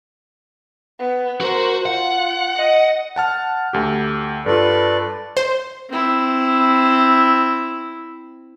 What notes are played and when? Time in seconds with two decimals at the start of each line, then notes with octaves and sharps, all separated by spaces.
0.99 B3
1.41 F#4 A#4 C5
1.86 F4 F#5
2.55 D#5
3.16 F#5 A5 F6
3.73 D2 G4
4.46 G2 F4 A4 B4 D5
5.37 C5
5.89 C4 E4